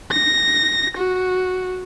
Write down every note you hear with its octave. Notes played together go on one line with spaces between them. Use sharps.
A#6
F#4